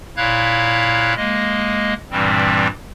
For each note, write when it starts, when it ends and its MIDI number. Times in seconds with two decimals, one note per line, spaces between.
0.17 1.14 46
0.17 1.14 64
0.17 1.14 73
0.17 1.14 77
0.17 1.14 90
0.17 1.14 92
1.17 1.94 56
1.17 1.94 58
1.17 1.94 75
2.11 2.67 43
2.11 2.67 46
2.11 2.67 52
2.11 2.67 55
2.11 2.67 60